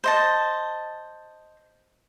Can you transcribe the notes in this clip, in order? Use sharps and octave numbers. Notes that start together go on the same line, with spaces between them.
C5 D#5 A5